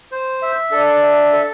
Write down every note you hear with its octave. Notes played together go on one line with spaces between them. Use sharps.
C5
E5
D4 A4
E5
A4